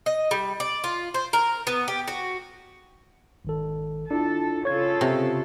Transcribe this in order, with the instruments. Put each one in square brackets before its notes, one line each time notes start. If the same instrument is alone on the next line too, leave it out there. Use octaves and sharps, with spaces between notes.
[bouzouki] D#5
G3
D5
F4
C5
A#4
B3
G4
F#4
[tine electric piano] G#1 D#3 A4
[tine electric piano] D4 E4 F4 [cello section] A4
[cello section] C#3 F4 A4 [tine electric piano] C#5 G#6
[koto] C3